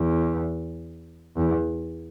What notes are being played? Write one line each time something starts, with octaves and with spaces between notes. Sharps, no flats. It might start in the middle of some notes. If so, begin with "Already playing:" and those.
Already playing: E2
E2